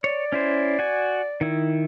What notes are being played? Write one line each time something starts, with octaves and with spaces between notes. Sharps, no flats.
C#5 D5
C#4 E4 C5
F#4 G#5
D#3 E4